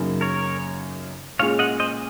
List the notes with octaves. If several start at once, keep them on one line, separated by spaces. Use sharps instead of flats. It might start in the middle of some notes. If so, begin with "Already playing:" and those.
Already playing: F#2 C#3 F#3 A#3 D#4
A#4 C#5
A#2 G#3 C#4 F4 G#4 C#5 F5
D#5 F#5
C5 D#5